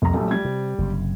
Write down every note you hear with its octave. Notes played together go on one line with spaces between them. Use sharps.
F1 C2 F2 A#3 A#5
A#1 F#3 G3 A3
G3 G#6
C3
F#1 C3